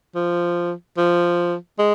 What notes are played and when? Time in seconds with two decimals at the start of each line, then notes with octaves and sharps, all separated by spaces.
0.15 F3
0.97 F3
1.79 G#3